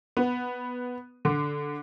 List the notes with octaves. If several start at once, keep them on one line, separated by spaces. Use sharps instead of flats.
B3
D3